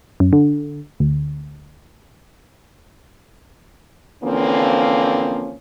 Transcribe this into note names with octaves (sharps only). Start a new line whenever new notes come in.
F#2
D3
D2
D3 E3 F3 A#3 C4 C#4